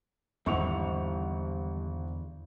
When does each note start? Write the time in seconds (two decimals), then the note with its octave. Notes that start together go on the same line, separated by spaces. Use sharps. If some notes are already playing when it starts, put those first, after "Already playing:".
0.46 G#1 E2 D3 G3 E4 C#6 F7